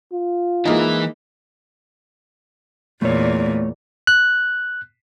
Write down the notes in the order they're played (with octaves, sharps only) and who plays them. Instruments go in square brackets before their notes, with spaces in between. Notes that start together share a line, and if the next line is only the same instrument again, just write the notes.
[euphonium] F4
[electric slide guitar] E3 E4 [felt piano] G#3 A#3 D#4
[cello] E2 A#2 [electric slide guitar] A3 C#5
[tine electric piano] F#6